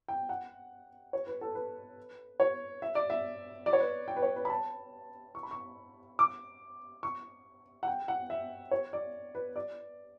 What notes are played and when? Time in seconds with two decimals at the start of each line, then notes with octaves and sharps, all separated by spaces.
0.08 G5
0.29 F#5
1.13 C#5
1.27 B4
1.41 A4
1.55 B4
2.40 C#5
2.82 E5
2.95 D5
3.10 E5
3.66 D5
3.73 C#5
3.80 B4
4.08 G5
4.16 B4
4.22 C#5
4.36 B4
4.45 B5
4.50 A5
5.35 C#6
5.43 B5
5.51 C#6
6.19 D6
7.03 C#6
7.83 F#5
7.87 G5
8.08 F#5
8.30 E5
8.71 C#5
8.93 D5
9.35 B4
9.56 D5